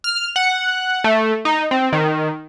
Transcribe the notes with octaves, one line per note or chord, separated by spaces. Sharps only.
F6
F#5
A3
D#4
C4
D#3